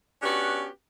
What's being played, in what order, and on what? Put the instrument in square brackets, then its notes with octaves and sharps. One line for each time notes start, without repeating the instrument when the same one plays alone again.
[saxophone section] B3 C#4 D4 F#4 G4 B4